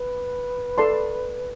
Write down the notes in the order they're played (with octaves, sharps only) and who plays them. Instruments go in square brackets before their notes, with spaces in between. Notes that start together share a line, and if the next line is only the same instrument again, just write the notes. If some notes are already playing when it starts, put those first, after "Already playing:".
Already playing: [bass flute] B4
[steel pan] A4 D5 A5 C6